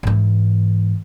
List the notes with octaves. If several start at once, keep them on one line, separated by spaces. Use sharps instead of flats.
G#2 E3